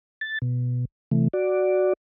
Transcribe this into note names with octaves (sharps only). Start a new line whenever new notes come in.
A6
B2
C3 E3 A3
F#4 D5